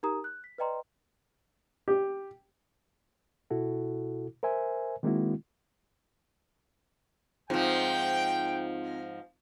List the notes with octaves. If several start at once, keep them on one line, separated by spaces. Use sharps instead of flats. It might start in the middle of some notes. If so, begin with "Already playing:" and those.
D#4 G4 A#4 A#5 D#6
F#6
B6
B4 D5 D#5 G5 A#5 C6
G4
B2 E4 F#4 A4
A#4 C5 E5 G#5
D#3 G#3 A#3 C4 E4 F#4
G#2 F3 C4 D#4 F4 G5